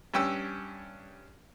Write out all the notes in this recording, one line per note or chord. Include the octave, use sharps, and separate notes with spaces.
G2 C#4 G5 E6